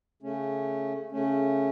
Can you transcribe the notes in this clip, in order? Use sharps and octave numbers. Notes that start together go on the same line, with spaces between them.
C#3 A3 C#4
C#3 A3 C#4